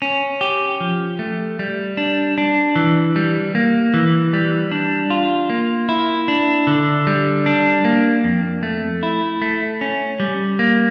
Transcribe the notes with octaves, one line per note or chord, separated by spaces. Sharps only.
C#4
G4
F3
A3
G3
D4
D4
E3
G3
A#3
E3
G3
D4
F4
A#3
E4
D4
D3
G3
D4
A#3
F2
A3
E4
A3
C#4
G3
A#3